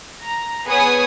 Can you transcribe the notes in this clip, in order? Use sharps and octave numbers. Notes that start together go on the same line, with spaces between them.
A#5
B3 G#4 B4 C#5 G#5 D#6